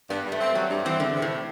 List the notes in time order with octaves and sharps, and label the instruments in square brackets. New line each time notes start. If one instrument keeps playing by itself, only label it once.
[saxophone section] G2 [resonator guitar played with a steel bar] B3
[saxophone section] G2
[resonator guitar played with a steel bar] A3
[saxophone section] C4
[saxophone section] F#3 [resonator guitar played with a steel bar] G3
[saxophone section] G2
[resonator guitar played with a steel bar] E3 [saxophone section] C4
[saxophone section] E2 [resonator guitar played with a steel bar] D3
[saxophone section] C3
[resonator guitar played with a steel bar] A2